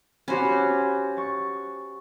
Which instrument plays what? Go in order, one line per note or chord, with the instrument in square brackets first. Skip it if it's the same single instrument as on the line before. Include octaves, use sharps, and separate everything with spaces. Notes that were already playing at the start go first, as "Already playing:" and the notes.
[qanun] C#4 F#4 [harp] G4 C5 B5
[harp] C#6 A6